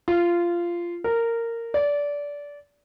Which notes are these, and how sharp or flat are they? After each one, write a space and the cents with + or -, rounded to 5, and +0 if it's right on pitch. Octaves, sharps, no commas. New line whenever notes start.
F4 -15
A#4 -15
D5 -20